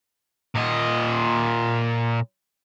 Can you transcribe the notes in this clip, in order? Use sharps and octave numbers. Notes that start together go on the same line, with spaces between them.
A#2 D#5